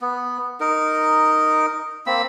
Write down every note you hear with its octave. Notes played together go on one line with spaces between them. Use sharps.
B3
D#4 A#4
A#3 C4 B5 E6